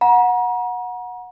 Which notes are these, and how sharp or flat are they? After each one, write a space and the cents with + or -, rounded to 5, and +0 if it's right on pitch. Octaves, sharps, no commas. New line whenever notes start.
F#5 -20 A#5 +35